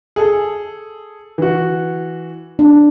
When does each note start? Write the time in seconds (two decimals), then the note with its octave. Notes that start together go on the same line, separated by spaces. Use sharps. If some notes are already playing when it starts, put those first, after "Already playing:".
0.16 G#4 A4
1.38 E3 F#4
2.59 D4